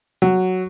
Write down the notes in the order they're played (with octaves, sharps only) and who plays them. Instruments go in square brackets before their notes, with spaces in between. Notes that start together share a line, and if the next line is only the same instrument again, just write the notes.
[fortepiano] F#3